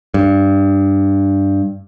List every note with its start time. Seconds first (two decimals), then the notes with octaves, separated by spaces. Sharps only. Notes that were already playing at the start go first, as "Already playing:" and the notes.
0.14 G2